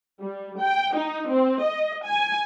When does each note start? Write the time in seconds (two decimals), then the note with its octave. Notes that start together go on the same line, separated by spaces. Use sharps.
0.22 G3
0.61 G5
0.97 D#4
1.31 C4
1.63 D#5
2.06 G#5